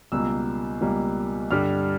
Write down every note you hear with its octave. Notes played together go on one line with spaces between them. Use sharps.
C#2 B2 G3 A#3 E6
C#2 B2 G3 A#3
G2 D3 G3 F6